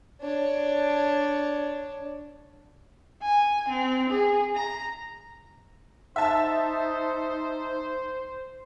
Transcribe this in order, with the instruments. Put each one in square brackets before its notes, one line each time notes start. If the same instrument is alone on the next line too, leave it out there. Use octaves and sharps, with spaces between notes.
[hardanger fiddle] D4 C#5
[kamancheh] G#5
C4
G#4
A#5
[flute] D#4 [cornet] C5 [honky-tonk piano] E5 A5